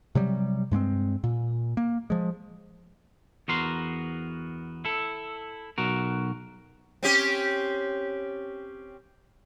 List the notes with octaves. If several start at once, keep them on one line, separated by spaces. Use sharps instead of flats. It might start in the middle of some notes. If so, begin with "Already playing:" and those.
C3 F#3 G3
G2 G#3 A#3 C4
A#2
A#3
F3 G#3
E2 B3 F#4 A#4 C6
E4 A4
B1 F#4 A#4
C4 C#4 G4